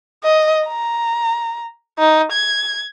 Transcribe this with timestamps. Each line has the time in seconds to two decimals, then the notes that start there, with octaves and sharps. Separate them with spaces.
0.24 D#5
0.68 A#5
1.99 D#4
2.32 G#6